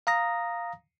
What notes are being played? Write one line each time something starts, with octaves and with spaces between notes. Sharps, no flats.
F5 A#5 D#6 A#6